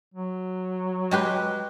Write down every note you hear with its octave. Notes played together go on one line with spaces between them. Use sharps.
F#3
G#3 G4 B4